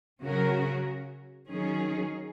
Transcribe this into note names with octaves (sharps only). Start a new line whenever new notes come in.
C#3 F#3 C#4 F#4 A#4
D#3 F#3 C#4 G#4